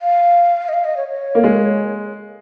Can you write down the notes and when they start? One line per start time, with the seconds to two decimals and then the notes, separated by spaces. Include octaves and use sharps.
0.02 F5
0.69 D#5
0.74 F5
0.84 D#5
0.97 C#5
1.09 C#5
1.35 A#3
1.44 G#3